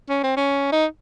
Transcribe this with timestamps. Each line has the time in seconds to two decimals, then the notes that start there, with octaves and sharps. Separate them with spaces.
0.09 C#4
0.23 C4
0.37 C#4
0.72 D#4